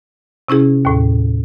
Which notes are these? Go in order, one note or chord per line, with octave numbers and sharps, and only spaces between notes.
C3 C#4 E4 G#4
D#2 A2